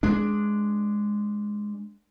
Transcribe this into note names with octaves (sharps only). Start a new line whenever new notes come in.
G#3 D4